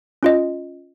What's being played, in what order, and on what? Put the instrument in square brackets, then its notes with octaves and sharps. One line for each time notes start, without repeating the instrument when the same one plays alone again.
[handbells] C#4 F4 D#5